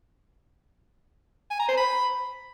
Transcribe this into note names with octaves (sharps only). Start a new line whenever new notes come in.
G#5
A#5
C5
B5